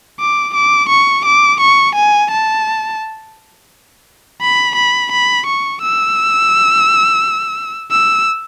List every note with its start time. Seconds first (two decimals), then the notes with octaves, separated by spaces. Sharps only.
0.20 D6
0.55 D6
0.90 C#6
1.25 D6
1.61 C#6
1.96 G#5
2.31 A5
4.41 B5
4.76 B5
5.12 B5
5.47 C#6
5.82 E6
7.91 E6